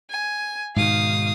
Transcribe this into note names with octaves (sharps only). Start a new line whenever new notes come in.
G#5
G#2 B2 D#3 F5 D#6